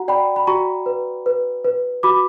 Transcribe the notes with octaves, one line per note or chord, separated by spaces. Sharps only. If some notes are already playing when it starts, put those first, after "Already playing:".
Already playing: F#4 F#5 A#5
D5 G5 B5
B5
F#4 A#5 C#6
B4
B4
B4
F#4 B5 D6